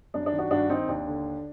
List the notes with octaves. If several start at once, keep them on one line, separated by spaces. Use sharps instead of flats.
F#2 D4
D4
D#3
D4 F#4
G2 D4 F#4
D#3 C4 D#4
D#2 D4
D3